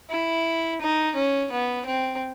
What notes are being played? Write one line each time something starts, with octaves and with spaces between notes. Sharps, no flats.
E4
D#4
C#4
B3
C4